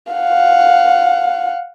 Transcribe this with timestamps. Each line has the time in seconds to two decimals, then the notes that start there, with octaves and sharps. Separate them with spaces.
0.12 F5 F#5